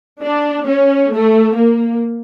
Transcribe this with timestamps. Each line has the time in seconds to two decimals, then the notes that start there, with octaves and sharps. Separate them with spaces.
0.22 D4
0.67 C#4
1.12 A3
1.56 A#3